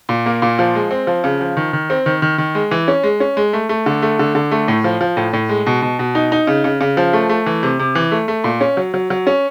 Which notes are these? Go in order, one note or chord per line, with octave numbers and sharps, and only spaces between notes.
A#2
A#3
A#2
F3
G#3
C4
F3
C#3
F3
D#3
D#3
C4
D#3
D#3
D#3
G#3
E3
C#4
G#3
C#4
G#3
A3
A3
D3
A3
D3
D3
A3
A2
F3
F3
A2
A2
G#3
B2
B2
B2
D#4
D#4
C#3
C#3
C#3
F3
A3
A3
E3
C3
C3
E3
A3
A3
A#2
C#4
F#3
F#3
F#3
C#4